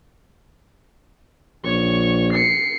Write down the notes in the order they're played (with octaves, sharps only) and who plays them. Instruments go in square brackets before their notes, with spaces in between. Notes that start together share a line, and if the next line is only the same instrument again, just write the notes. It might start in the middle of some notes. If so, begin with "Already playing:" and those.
[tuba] A#1 [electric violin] C#5 C#6
[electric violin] C7 C#7